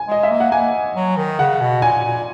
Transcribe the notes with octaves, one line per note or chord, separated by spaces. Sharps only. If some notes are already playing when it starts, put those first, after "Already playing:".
Already playing: G#5
G#3 D#5
E5
A#3
F#5
A#3 G#5
F#3
D#3
C#3 F#5
B2
A#2 G#5
A#2